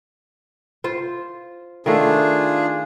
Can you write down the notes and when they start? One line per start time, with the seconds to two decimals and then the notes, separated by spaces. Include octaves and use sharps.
0.84 F4 C5
1.86 D#3 A3 D4 F4 G#4